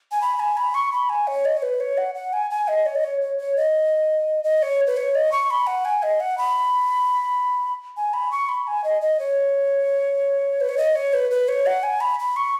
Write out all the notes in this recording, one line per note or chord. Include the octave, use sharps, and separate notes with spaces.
G#5
B5
G#5
B5
C#6
B5
G#5
C#5
D#5
C#5
B4
C#5
F#5
F#5
G#5
G#5
D#5
C#5
D#5
C#5
C#5
C#5
D#5
D#5
C#5
B4
C#5
D#5
C#6
B5
F#5
G#5
D#5
F#5
B5
G#5
B5
C#6
B5
G#5
D#5
D#5
C#5
B4
C#5
D#5
C#5
B4
B4
C#5
F#5
G#5
B5
B5
C#6